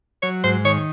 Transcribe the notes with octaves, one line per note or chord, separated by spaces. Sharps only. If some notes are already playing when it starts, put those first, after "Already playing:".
F#3 C#5
G#2 C5
D#3 C#5